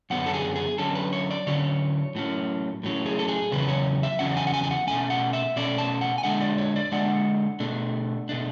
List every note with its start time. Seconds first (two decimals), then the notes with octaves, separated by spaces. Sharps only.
0.10 F#2 D3 F#3 B3 F#5
0.26 A4
0.34 G#4
0.56 G#4
0.78 D3 F#3 C#4 A4
0.95 B4
1.13 C#5
1.31 D5
1.47 D3 F#3 C#4 C#5
2.15 A2 F#3 C#4
2.83 A2 F#3 C#4
3.06 G#4
3.19 A4
3.28 G#4
3.51 E2 C#3 F#3 C#4 B4
3.68 C#5
4.03 E5
4.19 E2 C#3 F#3 C#4 F#5
4.37 G#5
4.47 F#5
4.54 G#5
4.64 G#5
4.71 F#5
4.87 B2 A3 C#4 G#5
5.10 F#5
5.33 E5
5.56 B2 A3 C#4 D5
5.78 A5
6.01 F#5
6.18 G#5
6.24 D3 G#3 D4 F#5
6.41 D5
6.58 C#5
6.76 D5
6.92 D3 G#3 D4 F#5
7.60 B2 A3 D4
8.29 B2 A3 D4